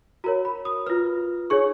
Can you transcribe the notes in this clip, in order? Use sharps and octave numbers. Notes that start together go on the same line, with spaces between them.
F#4 A#4 C#5 A#5
B5
D#6
F4 B4 F6
D#4 G#4 C#5 C#6